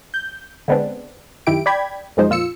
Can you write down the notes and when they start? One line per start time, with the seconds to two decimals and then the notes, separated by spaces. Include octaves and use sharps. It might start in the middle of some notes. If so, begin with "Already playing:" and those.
0.14 G6
0.68 D3 G#3 B3 C4 D4
1.47 F#2 D#3 E4 G4 D7
1.66 D5 G5 B5 G#6
2.17 F#2 B2 F3 G#3 D#4 C5
2.29 F2 A#2 F4 E6 C#7